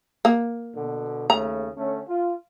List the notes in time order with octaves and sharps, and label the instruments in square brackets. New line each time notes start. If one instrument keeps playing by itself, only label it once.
[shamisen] A#3
[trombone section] B2 D3
[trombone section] D#2 C#3 A3 [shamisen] A#5
[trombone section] D3 A3 C#4
F4